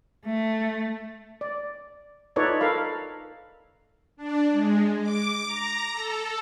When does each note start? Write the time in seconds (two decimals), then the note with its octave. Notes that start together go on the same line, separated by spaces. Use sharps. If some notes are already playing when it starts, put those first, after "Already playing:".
0.25 A3
1.41 D5
2.36 D#4 F4 A4 B4 C#5 D5
2.60 A4 A#4 F5 B5
4.17 D4
4.52 G#3
5.01 D6
5.45 A#5
5.93 A4